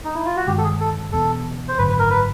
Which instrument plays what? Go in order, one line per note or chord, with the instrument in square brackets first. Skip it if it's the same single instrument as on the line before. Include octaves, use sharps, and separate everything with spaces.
[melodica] D#4
E4
F4
F#4
[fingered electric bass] G1 G2 D#3 G#3 [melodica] G4
[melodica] A4
G#4
A4
[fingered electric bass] E1 E2 B2 [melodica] A4
[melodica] C5
[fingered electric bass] G#1 F#2 D3 [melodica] B4
[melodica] B4
A#4
B4